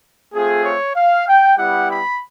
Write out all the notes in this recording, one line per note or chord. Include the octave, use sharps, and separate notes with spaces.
A3 C4 F4 G#4
C#5
F5
G5
G3 B3 E4 G4 F#5
B5